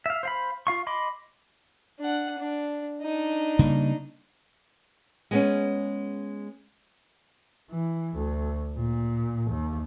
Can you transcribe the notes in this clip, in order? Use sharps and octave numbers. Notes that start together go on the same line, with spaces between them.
E5 F5
C5 F5 B5
F4 F5 C#6
D#5 B5 C6 D6
D4 F#5
D4
D4 D#4
C#3 G3 A#3
G#3 B3 C#4
E3
D2
A#2
D#2